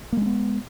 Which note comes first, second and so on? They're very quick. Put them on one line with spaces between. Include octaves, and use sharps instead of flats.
A#3 G#3 C#4 B3